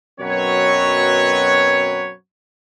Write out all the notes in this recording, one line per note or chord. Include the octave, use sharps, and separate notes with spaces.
F#2 B2 F#3 C4 B4 C#5